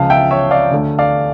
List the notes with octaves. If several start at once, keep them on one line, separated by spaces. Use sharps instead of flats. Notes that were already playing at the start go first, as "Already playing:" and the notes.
Already playing: C#2 C#3 F3 F5 A5
E5 G5
C#5 E5
D5 F5
D2 D3 A3
D5 F5